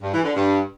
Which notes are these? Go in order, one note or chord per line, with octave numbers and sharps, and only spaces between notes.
G2
E3
D3
G2